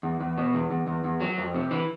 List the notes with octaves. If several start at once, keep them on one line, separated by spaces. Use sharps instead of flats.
E2
E2
B2
E2
E2
E2
E2
F#3
F2
C3
E3